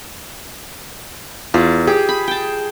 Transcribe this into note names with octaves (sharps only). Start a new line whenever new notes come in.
E2 F4
G4 G#4
B5
G5 A5